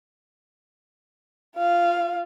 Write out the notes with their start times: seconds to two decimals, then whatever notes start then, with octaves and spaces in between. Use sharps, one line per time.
1.57 F4 F5